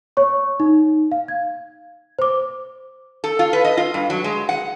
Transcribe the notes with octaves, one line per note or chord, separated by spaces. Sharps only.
C#5 C#6
D#4
F5
G#6
C5 D6
A4
F4
B4
D#5
F4
G2
F#3
G#3
F#5